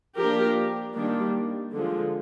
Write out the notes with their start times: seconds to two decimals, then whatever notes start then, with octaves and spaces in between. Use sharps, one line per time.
0.18 F3 A#3 D4 G4 A#4
0.96 D#3 G3 A#3 D4
1.73 D3 F3 G#3